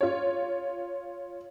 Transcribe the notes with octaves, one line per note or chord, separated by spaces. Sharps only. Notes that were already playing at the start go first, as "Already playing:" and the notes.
F4 C#5